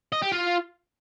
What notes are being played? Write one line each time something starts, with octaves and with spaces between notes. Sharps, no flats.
D#5
G4
F4